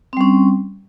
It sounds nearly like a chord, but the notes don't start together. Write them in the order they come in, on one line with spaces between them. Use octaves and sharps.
C4 G3 C#4